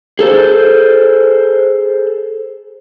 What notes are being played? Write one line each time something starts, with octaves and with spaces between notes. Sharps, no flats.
G#4 A4 C5